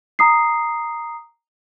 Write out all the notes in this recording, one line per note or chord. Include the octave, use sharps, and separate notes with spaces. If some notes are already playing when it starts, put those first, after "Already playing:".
A#5 D#6 C7